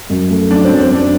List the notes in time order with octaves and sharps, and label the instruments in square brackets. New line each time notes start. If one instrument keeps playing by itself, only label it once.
[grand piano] F#2
A3
[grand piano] F#3 [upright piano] D4
[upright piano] C4
[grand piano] F#2
[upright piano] C4
[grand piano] F#2 [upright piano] D4